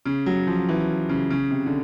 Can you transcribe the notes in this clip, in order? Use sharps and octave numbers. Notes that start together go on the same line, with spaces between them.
C#3
F#3
F3
E3
C#3
C#3
C3
D3